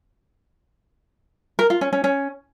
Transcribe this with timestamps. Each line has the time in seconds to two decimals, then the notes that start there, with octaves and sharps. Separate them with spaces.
1.59 A#4
1.70 F4
1.81 C#4
1.93 C#4
2.04 C#4